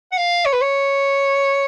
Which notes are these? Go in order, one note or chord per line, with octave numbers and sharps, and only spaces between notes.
F#5
F5
C#5
B4
C#5